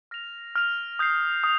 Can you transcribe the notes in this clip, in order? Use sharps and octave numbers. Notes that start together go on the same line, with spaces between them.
F6 A#6 F7
F6 A#6 F7
D#6 G6 C7
D#6